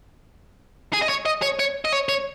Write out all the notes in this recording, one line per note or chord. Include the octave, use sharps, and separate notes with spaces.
G#4
D#5
C#5
D#5
C#5
C#5
D#5
C#5
C#5